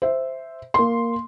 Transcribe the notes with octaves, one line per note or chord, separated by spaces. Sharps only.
C5 E5
A#3 C6